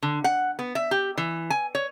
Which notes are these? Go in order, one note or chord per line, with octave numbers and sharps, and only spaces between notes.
D3
F#5
B3
E5
G4
E3
G#5
C#5